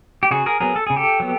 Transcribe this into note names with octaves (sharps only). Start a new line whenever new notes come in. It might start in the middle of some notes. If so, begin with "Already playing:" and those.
G4
C#3 F#4 G#4
G#4 A#4
F#3 B3 G#4 A#4
A4
C#3 G#4
G4 A4
F#3 B3